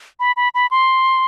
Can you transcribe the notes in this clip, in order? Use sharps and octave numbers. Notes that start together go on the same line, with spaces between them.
B5
B5
B5
C6